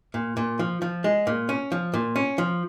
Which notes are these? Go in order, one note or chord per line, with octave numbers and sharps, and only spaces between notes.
A#2
A#2
F3
F3
G#3
A#2
C#4
F3
A#2
C#4
F3